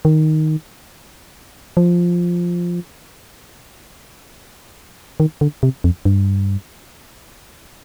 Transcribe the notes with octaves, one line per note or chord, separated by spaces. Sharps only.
D#3
F3
D#3
D3
C3
F2
G2